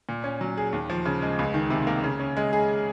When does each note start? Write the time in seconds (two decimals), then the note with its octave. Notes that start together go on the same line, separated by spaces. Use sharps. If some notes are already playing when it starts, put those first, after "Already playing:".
0.09 A#2
0.24 C#4
0.41 F#3
0.57 G#4
0.73 D#2
0.90 F3
1.05 C#3
1.22 G#3
1.39 C#2
1.54 D#3
1.70 C3
1.87 A#3
2.04 C#3
2.19 C#4
2.37 G#3
2.53 G#4